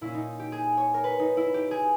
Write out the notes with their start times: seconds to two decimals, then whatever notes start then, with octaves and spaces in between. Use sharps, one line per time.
0.01 A#2 A#3 C#4 E4
0.15 D#4
0.40 G4
0.52 G#4
0.77 C#5
0.94 A#4
1.04 B4
1.20 D#4
1.37 E4
1.54 G4
1.71 G#4